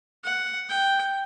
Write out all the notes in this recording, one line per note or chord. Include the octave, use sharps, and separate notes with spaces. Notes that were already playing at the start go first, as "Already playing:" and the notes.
F#5
G5